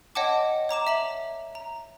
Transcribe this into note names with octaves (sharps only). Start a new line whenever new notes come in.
C#5 D#5 F#5 G5 A5 D6
C#5 A#5 D6 E7
E5 A#5 F#7
A#5